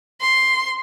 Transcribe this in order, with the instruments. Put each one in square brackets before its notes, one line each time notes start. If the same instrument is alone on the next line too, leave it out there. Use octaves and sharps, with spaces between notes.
[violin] C6